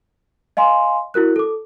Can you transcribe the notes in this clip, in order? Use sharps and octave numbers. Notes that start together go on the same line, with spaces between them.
D#5 F5 G#5 C6
E4 F#4 A#4 F#6
A4 D6